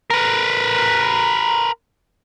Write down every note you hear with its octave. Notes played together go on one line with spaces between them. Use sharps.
A#4 B4